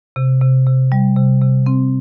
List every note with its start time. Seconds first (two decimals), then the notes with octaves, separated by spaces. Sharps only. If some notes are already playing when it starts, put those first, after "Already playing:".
0.16 C3
0.41 C3
0.66 C3
0.92 G3
1.16 C3
1.41 C3
1.66 C4